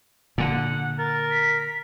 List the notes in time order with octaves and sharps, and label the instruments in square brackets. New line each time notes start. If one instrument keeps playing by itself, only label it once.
[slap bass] A#2 D3 [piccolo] F#5
[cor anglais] A#4 [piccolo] A6
[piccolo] B6